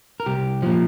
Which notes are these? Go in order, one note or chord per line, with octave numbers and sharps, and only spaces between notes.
A#4
C2 G4
A#2 F3